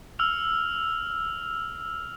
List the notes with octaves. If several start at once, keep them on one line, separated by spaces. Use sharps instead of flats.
E6 F6 F7